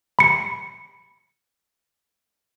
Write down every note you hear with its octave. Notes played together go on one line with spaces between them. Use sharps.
B5 C#7